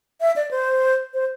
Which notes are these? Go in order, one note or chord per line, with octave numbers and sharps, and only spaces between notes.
E5
D5
C5
C5